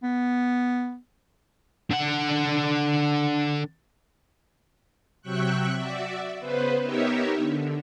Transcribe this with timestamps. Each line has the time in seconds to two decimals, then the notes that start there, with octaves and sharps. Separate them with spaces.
0.03 B3
1.91 D3 F#5
5.21 C3 F#3 E5 G5 C#6 F#6
5.75 F#4 D5 E5
6.39 C#3 B3 B4 C5
6.82 B3 D#4 G4 A#4 C#5 E5
7.36 D3